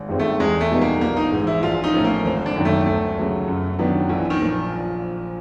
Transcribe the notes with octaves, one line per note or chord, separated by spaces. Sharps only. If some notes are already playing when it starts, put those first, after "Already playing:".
Already playing: G#1
G2 D#3 G#3 C4
A3
E2 G#3
A3
B2 G3 B3 D#4
A#3
A#1 A#3
D#4
G#2 E3
E4
A#1 F4
D#4
A2 F3 A3 C#4
A#3
G#1 C4
D4
F#2 D#3 F#3
A3
D2 A3
C#3 F#3 B3
F#2
D#3 F#3 B3 D4
A#1 E3
D#3
A#2 F3